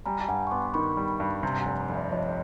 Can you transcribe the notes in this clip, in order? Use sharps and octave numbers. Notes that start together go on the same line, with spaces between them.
G3 G#5 A#5
A5
G2 F#5 G#5
C#6
B3 C6 D6
D#3 B5 C#6
G3
G2
C3 G#5 A#5
F1 F#5 G#5
F1
D5 E5
F2 C#5 D#5